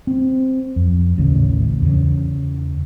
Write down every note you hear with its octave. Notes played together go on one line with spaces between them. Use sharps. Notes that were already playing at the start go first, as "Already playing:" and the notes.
C4
F2
A1 D#2 C#3
E2 C#3